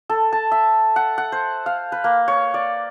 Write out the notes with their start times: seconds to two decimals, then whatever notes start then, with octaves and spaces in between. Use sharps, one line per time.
0.09 A4
0.33 A5
0.52 E5
0.96 F#5
1.18 F#5
1.32 C5
1.66 F5
1.92 B4
2.04 A#3
2.28 C#5
2.54 D5